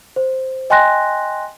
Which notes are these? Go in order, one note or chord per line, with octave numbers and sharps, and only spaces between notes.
C5
D#5 G5 G#5 C6 F#6 A#6